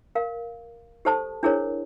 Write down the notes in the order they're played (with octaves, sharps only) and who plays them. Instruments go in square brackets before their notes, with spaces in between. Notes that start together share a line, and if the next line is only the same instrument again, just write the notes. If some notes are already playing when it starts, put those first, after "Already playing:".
[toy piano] A#4 F5
G4 A4 C5 A5 D#6
D4 E4 G#4 A#4 C5 C#5